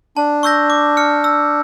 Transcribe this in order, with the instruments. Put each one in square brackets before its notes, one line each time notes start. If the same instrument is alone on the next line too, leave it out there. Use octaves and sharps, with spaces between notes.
[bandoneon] D4 [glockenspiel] A5
[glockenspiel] C#6 E6 G6 A#6
D6
F6 C#7
E6